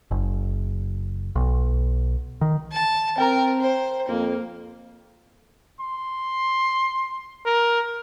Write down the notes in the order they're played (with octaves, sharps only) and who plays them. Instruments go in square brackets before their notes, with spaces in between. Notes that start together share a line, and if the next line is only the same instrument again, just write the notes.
[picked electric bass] F#1
B1
D#3
[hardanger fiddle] A5
[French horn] C4 [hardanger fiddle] A#4 [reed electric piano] G5 A#5
[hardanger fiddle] C5
[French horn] F2 [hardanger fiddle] A#3
[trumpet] C6
A#4